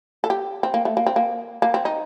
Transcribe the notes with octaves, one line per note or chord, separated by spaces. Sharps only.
A4
G4
C4
A#3
A3
A#3
C4
A#3
A#3
C4
D#4